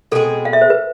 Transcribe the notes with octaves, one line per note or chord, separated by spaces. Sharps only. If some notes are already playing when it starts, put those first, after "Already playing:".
B2 G#3 C4 G#4 A4
F5
E5
C5
B4